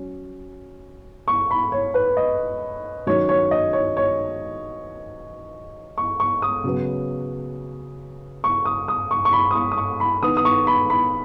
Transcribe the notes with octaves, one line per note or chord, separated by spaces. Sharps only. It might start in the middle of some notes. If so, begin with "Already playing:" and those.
Already playing: F#3 C#4
C#6
B5
C#5
B4
D#5
D#3 F#3 C#4 C#5
C#5
D#5
C#5
C#5
C#6
C#6
D#6
C#3 F#3 B3
C#6
D#6
D#6
C#6
C#6
B5
D#6
C#6
D#6
C#6
B5
D#3 B3 D#6
D#6
C#6
B5
B5